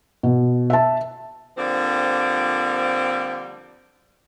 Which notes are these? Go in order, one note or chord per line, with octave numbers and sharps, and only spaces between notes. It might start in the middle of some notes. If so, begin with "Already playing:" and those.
B2
E5 A5
D3 F3 G3 A#3 C4